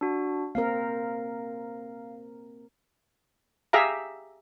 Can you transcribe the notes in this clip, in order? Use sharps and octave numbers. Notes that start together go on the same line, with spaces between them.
D4 F#4
A#3 C4 A#4 F5
G4 G#4 E5 F5 A#5